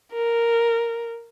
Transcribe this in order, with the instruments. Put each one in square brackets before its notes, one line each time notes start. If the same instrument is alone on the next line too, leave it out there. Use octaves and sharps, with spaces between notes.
[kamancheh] A#4